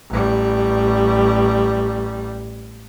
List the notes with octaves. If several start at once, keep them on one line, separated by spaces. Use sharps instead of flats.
A1 G3